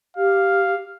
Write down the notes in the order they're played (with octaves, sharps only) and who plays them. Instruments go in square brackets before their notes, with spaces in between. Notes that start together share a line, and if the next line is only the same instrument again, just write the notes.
[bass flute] G4 [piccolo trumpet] F5